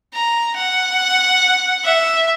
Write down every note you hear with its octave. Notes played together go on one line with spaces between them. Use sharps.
A#5
F#5
E5